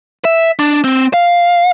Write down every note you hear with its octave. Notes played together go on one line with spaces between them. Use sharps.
E5
D4
C4
F5